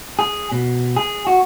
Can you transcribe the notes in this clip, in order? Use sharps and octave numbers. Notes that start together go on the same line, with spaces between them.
G#4
B2
G#4
F#4